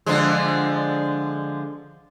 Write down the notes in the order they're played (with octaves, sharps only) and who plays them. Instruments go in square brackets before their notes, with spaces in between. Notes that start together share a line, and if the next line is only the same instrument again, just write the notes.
[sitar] D3 F3 G#3